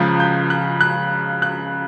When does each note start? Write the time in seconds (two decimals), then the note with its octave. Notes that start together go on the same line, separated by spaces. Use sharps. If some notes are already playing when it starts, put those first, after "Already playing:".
Already playing: C#2 C#3 F3 F#6
0.20 G6
0.50 F#6
0.81 F#6
1.42 F#6